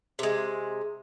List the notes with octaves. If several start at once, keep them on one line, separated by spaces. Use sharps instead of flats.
C3 G#3